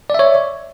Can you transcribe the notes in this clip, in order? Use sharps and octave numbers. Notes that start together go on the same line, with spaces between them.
C#5 D5 E5